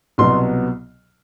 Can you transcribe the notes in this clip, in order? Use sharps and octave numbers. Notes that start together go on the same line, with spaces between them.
C2 B2 F#3 B3 C6